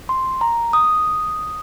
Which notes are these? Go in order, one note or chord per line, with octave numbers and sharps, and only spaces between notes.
C6
A#5
D#6